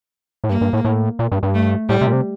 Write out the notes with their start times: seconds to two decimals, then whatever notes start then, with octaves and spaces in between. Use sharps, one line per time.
0.44 A2
0.49 G2 A#3
0.61 G2
0.73 A2
0.85 A2
1.19 A#2
1.32 G2
1.43 G2
1.54 A3
1.89 A2 G3
2.01 C3
2.07 A#2
2.13 C3